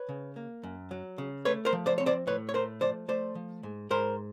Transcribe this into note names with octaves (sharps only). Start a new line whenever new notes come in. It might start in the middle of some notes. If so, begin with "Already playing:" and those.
Already playing: B4 C#5
C#3
A#3
F#2
F#3
C#3
A3 B4 C#5
A#4 C5
F3
C5 D5
C4 C#5
C5 D5
A2 B4 C#5
C#5
A3 A#4 C5
F3 C5 D5
A3 C5 D5
F3
G#2
G#2 A#4 C5